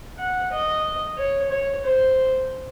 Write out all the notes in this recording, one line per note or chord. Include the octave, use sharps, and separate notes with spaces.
F#5
D#5
C#5
C#5
C5